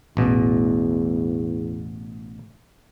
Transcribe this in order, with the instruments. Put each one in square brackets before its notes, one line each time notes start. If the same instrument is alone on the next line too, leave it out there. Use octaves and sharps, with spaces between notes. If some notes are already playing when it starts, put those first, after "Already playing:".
[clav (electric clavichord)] A1 B2 [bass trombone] E2